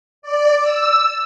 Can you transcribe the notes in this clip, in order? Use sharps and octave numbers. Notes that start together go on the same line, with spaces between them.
D5
E6